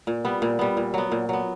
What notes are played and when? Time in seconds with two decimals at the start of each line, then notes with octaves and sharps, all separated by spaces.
0.07 A#2
0.25 G3 B3
0.42 A#2
0.59 G3 B3
0.77 A#2
0.94 F#3 B3
1.12 A#2
1.29 F#3 B3